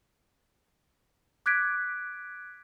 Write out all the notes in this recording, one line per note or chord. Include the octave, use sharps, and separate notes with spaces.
D6 F#6 G#6 B6 D7